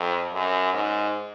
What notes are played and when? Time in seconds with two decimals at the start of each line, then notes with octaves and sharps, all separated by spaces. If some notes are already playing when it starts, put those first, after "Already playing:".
Already playing: F2
0.33 F#2
0.73 G#2